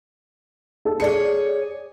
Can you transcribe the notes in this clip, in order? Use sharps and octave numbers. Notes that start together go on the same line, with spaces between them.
A4
G#4 C#5 D5 C#7